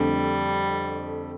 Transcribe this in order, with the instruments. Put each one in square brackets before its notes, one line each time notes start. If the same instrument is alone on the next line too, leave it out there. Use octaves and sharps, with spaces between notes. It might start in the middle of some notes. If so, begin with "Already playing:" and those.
Already playing: [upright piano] F2 D3 A3 [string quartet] G3